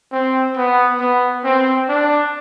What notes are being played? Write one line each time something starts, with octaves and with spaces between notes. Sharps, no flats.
C4
B3
B3
C4
D4